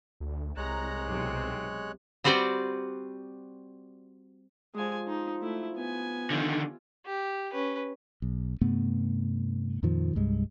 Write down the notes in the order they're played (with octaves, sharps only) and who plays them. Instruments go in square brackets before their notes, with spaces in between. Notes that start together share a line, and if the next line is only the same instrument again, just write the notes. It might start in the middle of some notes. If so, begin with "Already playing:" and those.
[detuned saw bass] D2
[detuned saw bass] C2 [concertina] G#3 C#5 F#6 [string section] A#5
[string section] B1 C3
[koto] G3 C4 F#4 B4 C5 D5
[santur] F3 G3 D#6 [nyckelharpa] G#3 G#5
[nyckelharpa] D#4 [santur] C6
[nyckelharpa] A3 E4
B3 G#5
[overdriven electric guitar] D3 D#3 [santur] G3 F4 E5
[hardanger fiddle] G4
C#4 B4
[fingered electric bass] B1
G2 C3 A3 B3
F2 A#2 D#3 F3
C2 G2 G#3